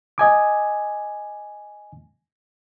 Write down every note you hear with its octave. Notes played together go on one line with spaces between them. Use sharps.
D#5 G#5 D6